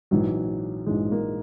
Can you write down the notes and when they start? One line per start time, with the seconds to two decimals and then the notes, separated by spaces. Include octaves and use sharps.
0.11 A#1 G#2 E3 F#3
0.86 A#1 G#2 E3 G#3
1.11 A#3